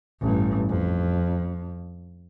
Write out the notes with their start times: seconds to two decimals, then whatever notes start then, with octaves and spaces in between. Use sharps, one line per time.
0.21 A1 G2
0.69 F2